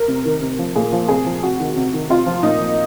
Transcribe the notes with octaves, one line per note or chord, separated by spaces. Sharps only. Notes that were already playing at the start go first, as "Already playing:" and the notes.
Already playing: A#4
C3
D#3
C3
F3
A#2 G#4
F3
C3 G#4
F3
C3 F#4
D#3
C3
D#3
C3 F4
F3
A#2 D#4
F3